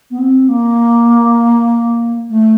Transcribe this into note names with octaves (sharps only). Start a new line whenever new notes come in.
B3
C4
A#3
A3